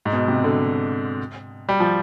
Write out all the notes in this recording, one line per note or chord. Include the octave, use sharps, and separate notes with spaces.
G#2
B2
C3
D3
G3
F3